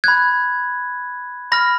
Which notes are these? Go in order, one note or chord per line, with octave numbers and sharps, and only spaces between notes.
B5 F#6 G#6
B5 F6 A#6